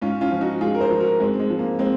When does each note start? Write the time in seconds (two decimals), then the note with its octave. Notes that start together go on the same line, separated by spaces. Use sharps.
0.02 G#2 C#4 F4
0.21 C#4 F4
0.31 F3
0.41 D#4 F#4
0.61 G#2 F4 G#4
0.75 A#4
0.81 G#4 C5
0.90 F3
1.00 F#4 A#4
1.20 G#2 G#3 C4
1.39 G#3
1.50 F3
1.59 A#3
1.79 G#3 C4